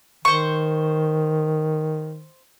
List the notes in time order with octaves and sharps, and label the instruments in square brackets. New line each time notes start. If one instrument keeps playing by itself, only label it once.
[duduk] D#3 [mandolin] C5 C#6